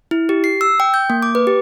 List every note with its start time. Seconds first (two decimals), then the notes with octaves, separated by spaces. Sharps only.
0.11 E4
0.29 G4
0.44 C7
0.61 E6
0.80 G5
0.94 G6
1.10 A#3
1.22 D6
1.35 B4
1.47 G4